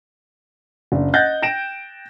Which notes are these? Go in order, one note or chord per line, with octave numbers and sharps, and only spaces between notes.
F#1 D4
D#5 F#5 F#6 G6 A6 A#6
G5 A#6 D7 E7